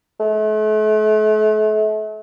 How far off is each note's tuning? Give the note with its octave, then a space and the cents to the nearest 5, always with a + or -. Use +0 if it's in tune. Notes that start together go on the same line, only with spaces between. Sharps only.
A3 -40